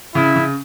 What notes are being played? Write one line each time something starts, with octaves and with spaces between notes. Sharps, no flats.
C#3 E4
C#3